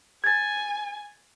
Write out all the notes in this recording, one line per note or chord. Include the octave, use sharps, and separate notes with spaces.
G#5 G#6 A6